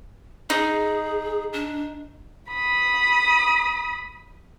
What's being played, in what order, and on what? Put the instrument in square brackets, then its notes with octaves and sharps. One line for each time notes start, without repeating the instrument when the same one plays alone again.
[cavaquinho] D#4 [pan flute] G#4
[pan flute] D4
[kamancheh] B5 D#6